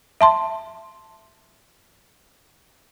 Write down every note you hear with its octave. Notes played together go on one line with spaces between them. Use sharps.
E5 A5 C6